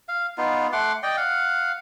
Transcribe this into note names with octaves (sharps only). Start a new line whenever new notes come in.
F5
B3 D#4 F4
A3 F#5 C6 D6
D5 D#5 G5
F5 F#5